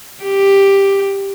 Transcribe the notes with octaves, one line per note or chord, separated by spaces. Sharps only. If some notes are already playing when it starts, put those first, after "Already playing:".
G4